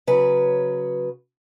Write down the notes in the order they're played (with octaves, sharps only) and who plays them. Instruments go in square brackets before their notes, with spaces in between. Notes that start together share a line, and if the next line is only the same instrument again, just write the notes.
[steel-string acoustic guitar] C#3 F#3 B4